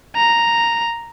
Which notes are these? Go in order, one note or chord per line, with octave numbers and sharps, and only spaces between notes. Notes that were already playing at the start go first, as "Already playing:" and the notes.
A#5